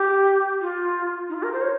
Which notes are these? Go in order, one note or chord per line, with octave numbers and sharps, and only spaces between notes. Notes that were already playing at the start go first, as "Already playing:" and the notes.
Already playing: G4
F4
D#4
F4
A#4
C5
C#5